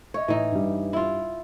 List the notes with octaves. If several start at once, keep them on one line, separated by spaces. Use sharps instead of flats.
C#5 D#5 E5
A2 E3 D#4
G2 G3
E4 F4